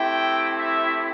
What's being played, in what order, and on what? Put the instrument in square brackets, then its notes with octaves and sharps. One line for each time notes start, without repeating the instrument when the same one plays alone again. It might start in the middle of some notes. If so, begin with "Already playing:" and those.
Already playing: [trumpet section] A3 C4 E4 G4 G5
E5